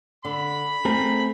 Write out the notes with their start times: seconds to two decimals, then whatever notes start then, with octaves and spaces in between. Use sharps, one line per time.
0.25 D3 B5
0.85 A3 C4 G#4 A#4